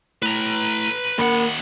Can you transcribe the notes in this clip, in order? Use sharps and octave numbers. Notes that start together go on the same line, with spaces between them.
A2 B4 A#5
D#2 A#3 A#4 F#5 B5